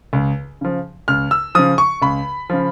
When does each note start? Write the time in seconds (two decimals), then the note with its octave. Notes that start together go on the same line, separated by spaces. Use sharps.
0.13 C#2
0.61 C#3 F3
1.08 C#2 F6
1.31 E6
1.55 C#3 F3 D#6
1.78 C#6
2.02 C#2 B5
2.50 C#3 F3